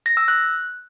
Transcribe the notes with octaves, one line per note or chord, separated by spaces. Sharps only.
A#6
E6
F#6